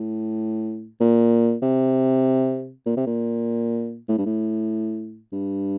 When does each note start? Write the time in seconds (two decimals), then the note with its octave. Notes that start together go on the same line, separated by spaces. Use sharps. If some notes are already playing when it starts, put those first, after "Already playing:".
Already playing: A2
1.00 A#2
1.62 C3
2.86 A#2
2.97 C3
3.07 A#2
4.09 A2
4.18 G2
4.26 A2
5.32 G2